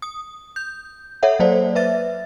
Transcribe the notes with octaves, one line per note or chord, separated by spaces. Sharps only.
D#6
G6
A4 C#5 E5 F#5
F#3 A#3 C5 D5
B4 E5 A6